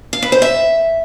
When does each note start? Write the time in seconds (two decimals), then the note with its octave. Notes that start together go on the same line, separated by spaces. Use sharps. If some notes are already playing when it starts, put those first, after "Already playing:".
0.13 F5
0.22 B4
0.32 C5
0.42 E5